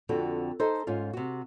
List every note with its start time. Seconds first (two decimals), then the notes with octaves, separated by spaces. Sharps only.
0.09 F2 D3 C4 F#4
0.60 D#4 A4 C5
0.87 G#2 C#4 F4
1.13 C3 F#4